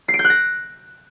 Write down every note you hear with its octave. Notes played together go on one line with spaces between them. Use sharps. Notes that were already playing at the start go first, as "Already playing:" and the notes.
C7
D7
G6
F#6
A#6